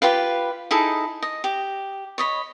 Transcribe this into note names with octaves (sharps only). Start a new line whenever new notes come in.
F4 G4 B4 F5
D#4 E4 G#4 A4
D#5
G4
C#5 D#5 B5